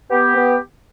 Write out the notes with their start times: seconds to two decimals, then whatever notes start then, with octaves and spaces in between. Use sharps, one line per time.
0.10 B3 G4
0.36 B3